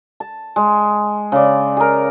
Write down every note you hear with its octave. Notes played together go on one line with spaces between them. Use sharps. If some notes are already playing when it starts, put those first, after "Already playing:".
A5
G#3
C#3 D5
G#4 A#4